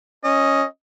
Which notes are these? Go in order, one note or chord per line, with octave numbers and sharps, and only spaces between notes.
C#4 D#5